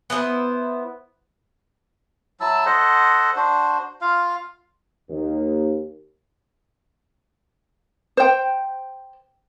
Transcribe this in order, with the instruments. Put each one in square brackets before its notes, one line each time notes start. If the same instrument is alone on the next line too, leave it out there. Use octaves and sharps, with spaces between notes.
[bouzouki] B3 E4 G4 C5
[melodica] F#3 E4 A5 E6
A4 C5 D#5 F#5
D4 F#4 C5
F4 F5
[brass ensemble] D#2
[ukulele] C5 G5